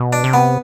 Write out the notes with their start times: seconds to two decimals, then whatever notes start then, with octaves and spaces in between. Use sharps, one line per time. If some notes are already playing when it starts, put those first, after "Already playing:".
Already playing: B2
0.13 D4
0.24 C3
0.33 B3